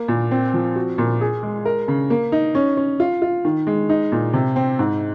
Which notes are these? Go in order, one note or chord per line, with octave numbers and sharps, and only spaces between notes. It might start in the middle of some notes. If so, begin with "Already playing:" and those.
Already playing: A#3
A#2
C4
F3
F#4
A#2
G#4
G#3
A#4
C#3
A#3
D#4
C#4
C#4
F4
F4
D#3
G#3
D#4
A#2
C3
C4
G#2